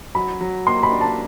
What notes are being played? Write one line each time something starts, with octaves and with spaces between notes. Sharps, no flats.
F#3 B5
F#3
A#3 C6
B5
D4
A5